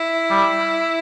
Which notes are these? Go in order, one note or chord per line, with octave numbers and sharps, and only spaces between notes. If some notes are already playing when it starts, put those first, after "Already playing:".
Already playing: E4
G3